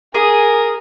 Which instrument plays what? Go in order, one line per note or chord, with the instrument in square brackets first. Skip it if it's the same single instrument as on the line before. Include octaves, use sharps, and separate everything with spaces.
[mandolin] G#4 [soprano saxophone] A#4 [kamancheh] G#5 D#6